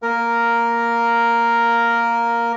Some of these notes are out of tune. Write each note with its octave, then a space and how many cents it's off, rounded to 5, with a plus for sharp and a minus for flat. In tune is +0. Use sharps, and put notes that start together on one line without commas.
A#3 +0 A#4 +0